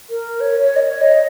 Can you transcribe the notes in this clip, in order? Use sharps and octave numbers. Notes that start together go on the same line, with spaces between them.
A#4
C#5
C#5
D#5
C#5
D#5